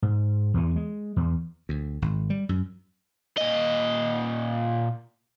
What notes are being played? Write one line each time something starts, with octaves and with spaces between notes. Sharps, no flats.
G#2
E2 E3
G#3
E2
D2
G#1
G3
F#2
A#2 D#5